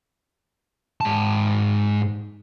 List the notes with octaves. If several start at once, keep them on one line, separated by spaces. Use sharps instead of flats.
G#2 A5